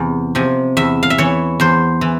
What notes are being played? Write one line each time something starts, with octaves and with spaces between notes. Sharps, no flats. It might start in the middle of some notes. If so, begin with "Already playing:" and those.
Already playing: E2 C3
C3 F3
E2 E5
F5
E5
E3 C#5
E2 C5
E3